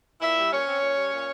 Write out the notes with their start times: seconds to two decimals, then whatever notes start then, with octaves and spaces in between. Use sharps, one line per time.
0.22 A#2 E4 E5
0.37 G3
0.52 A#2 C#4 C#5
0.67 C4
0.82 A#2
0.96 G3
1.11 A#2